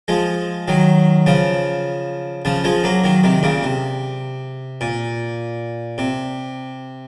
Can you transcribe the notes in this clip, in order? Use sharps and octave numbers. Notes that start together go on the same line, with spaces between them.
F3 G#3
D#3 F#3
C#3 F3
C#3 F3
F3 G#3
F#3 A#3
D#3 F#3
C3 D#3
A#2 C#3
C3
A#2
C3